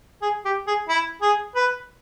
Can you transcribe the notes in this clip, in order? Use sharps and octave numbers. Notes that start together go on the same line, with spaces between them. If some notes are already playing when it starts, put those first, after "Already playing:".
G#4
G4
G#4
E4
G#4
B4